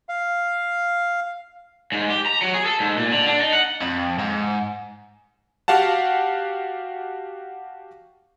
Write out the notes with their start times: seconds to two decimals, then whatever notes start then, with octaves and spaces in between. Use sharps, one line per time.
0.09 F5
1.92 G#2
2.10 G4
2.26 A#5
2.42 F#3
2.54 G#4
2.66 A4
2.80 G#2
2.97 A#2
3.12 D3
3.26 D4
3.40 D#4
3.53 F#5
3.82 F2
4.19 G#2
5.68 F#4 G4 F5 F#5 A5